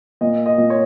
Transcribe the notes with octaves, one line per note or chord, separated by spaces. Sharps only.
A#2 D#5
D#5
A#2
C#5